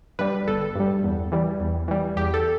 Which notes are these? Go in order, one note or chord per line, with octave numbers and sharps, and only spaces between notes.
G2 G3 B4
G1 A4
G2 G3
E2
E3 G3
E2
E3 G3
E2 G4
A4